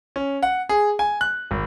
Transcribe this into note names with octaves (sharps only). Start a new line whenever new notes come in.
C#4
F#5
G#4
G#5
F#6
G#1